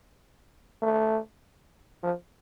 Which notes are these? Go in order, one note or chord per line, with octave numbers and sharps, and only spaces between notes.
A3
F3